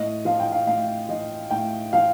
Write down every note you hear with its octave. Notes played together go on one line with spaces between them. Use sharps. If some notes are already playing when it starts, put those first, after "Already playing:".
Already playing: A2 D#5
F3 F5
G5
F5
A2 F5
F3 D#5
A2 G5
F3 F5